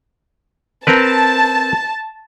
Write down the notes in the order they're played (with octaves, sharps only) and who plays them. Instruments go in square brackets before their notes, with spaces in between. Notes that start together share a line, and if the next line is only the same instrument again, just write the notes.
[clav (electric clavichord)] C4 A#4 B4 [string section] A5